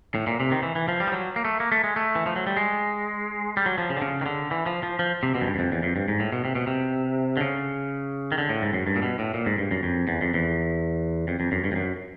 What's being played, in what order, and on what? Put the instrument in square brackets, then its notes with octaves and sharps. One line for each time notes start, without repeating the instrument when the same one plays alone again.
[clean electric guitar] A2
A#2
C3
D#3
E3
E3
F3
G3
F3
F#3
A#3
A3
A#3
A3
G#3
A3
E3
F3
F#3
G3
G#3
G3
F#3
F3
C#3
D3
C#3
D#3
D3
E3
F3
F3
F3
C3
B2
F#2
G2
F#2
F2
E2
F2
G2
G#2
A2
B2
C3
B2
C3
D3
C#3
D#3
D3
A2
G#2
F#2
G2
A#2
B2
A2
A#2
G#2
G2
F#2
F2
E2
F2
E2
F2
F2
F#2
G2
F2
F#2